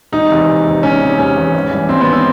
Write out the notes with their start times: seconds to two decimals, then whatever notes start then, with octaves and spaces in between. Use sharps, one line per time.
0.12 E1 D#4
0.30 E2 C3
0.48 E1
0.65 E2
0.70 C3
0.83 E1 C#4
1.01 E2 C3
1.19 E1 C#4
1.36 E2 C3
1.54 G#1
1.71 G2 E3
1.89 G#1 C4
2.01 B3
2.07 E3
2.13 C4